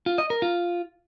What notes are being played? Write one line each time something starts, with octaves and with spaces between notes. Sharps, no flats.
F4
D#5
A#4
F4